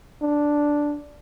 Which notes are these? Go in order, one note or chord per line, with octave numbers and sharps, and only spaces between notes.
D4